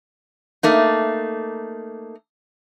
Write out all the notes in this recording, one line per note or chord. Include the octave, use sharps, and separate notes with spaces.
A3 A#3 D#4